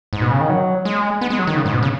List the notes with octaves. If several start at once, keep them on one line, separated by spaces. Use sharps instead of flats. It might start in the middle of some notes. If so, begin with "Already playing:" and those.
G#2
B2
C#3
D#3
F#3
G#3
B3
G#3
F#3
D#3
C#3
G#2
B2
C#3